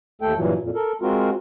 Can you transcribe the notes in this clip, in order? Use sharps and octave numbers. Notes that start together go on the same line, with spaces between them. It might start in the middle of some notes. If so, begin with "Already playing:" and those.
D#2 A3 A4 G5
G2 A#2 E3 F#3
F2 A#2
A4 A#4
G#3 C4 F4 F#4 A#4